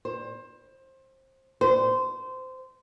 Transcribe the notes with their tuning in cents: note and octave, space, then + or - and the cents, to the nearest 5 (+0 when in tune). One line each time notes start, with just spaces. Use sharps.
C5 +25
C5 -20